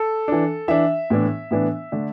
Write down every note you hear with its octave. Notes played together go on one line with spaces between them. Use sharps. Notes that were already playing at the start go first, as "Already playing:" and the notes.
Already playing: A4
E3 D4
E3 D4 E5
A2 E3 B3 D4
A2 E3 B3 D4
D3 A3 D4